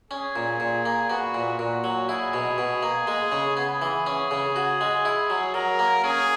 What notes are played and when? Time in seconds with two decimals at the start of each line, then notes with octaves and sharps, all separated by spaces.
0.11 C#4 G#4
0.36 A#2
0.60 A#2
0.85 A#3
1.10 B3 F#4
1.34 A#2
1.59 A#2 F#4
1.84 F#3
2.09 E4 G#4
2.34 B2
2.58 B2
2.83 A#3
3.07 G#3
3.32 C#3
3.56 B3 G#4
3.82 E3
4.06 C#4
4.31 C#3
4.56 F#4
4.81 G#3
5.05 E4
5.30 F#3
5.54 F#3 A#4
5.79 A#3
6.04 C#4 G#4